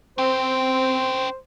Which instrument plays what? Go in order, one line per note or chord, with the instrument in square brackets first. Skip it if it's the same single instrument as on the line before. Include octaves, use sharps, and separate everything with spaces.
[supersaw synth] C4 [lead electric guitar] C#4 G5 [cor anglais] C5